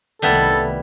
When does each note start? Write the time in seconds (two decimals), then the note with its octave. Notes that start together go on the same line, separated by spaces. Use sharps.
0.22 C2 D#3 G3 A3 B3 E4 A4